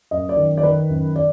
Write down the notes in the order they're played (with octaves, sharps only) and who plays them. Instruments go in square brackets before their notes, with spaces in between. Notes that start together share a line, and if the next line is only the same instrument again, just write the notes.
[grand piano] F#2 D#5
D5
D#3
D5
D#3 B4
F#2
D5